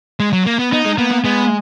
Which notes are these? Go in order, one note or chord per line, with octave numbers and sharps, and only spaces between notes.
G#3
F#3
A#3
B3
B3 D#4
G#3
A#3 B3
A#3
G#3 B3